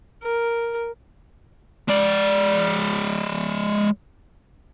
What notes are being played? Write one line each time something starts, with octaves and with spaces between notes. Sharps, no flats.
A#4
G#3 D5